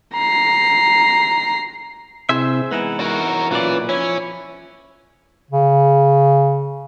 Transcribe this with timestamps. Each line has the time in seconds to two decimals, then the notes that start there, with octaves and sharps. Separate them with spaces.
0.14 A#5 C7
2.29 C3 C4 E4 G#4 C5 E5
2.71 E3 G#3 B3 D#4 E4 F#5
3.00 F#4 A#4
3.51 B1 A#2 E3 C#4 F4 D5
3.89 F3 C#4 E4
5.51 C#3